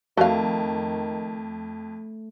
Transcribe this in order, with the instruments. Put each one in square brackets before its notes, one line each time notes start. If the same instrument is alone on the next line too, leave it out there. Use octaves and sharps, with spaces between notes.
[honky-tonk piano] F2 [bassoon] D#3 [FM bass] A3 [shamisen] F#4 F5